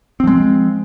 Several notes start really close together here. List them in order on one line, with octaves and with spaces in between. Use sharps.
C4 F3 G#3